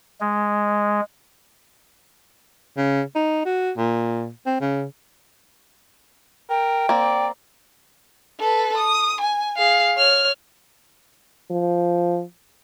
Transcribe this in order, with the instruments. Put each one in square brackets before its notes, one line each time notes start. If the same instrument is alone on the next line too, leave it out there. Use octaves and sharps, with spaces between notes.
[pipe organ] G#3
[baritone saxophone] C#3
D#4
F#4
A#2
C4
C#3
[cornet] A#4 [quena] G5
[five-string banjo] A#3 C4 [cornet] D5
[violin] A4 B4
D#6
G#5
G#4 F5
C#5 F6
[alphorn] F3